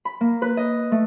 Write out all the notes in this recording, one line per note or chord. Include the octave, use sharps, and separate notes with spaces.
B5
A#3
B4
D#5
A3